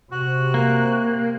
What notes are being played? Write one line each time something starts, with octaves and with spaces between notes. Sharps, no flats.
C3 F#4 F#6
A#3